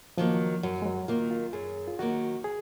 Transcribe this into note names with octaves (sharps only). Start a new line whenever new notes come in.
D#3 F3 F#3 A#3
F#2 F#3
G#3
F#3
D#3 F#3 A#3 F4
F4
F#2 G#4
F4
D#3 F#3 A#3 F#4
G#4